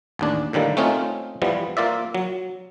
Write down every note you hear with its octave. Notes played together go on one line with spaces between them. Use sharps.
A1 D#2 D4
A2 D3 D#3 G3 A#3
A3 C4 C#4 D#4 F4
E3 F3 G3 B3
A#3 F4 D5 E5
F#3